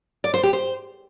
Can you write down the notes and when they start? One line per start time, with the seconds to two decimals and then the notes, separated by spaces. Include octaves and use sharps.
0.24 D5
0.34 C5
0.43 G4
0.53 C5